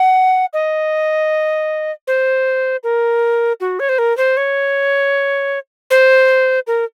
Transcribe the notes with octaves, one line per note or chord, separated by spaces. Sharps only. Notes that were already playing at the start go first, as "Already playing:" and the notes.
Already playing: F#5
D#5
C5
A#4
F#4
C#5
C5
A#4
C5
C#5
C5
A#4